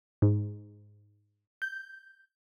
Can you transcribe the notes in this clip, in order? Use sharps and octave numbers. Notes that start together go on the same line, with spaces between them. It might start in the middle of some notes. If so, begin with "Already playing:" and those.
G#2
G6